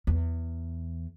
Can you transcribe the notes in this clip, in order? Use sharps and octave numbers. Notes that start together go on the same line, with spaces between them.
E2